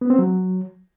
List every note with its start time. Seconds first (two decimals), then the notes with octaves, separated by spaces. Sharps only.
0.01 B3
0.10 C4
0.19 F#3